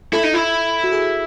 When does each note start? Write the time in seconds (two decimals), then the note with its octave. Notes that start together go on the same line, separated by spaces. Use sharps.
0.13 E4 A4
0.23 D#4
0.34 E4
0.84 F#4
0.92 G#4